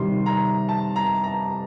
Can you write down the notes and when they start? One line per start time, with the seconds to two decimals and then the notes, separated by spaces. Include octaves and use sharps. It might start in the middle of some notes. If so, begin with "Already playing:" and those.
Already playing: C3 D#3 G3 C6
0.26 A#5
0.69 A5
0.96 A#5
1.24 A#5